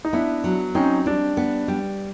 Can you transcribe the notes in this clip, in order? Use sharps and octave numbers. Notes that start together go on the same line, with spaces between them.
D#4
B3 D4 E4
F#3
C4 C#4 D#4
G3 D4
B3
G3